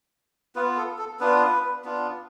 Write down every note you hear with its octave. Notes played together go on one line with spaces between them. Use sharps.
B3 F4 B4
A4
A4
B3 D4 F4 B4
B3 D4 F4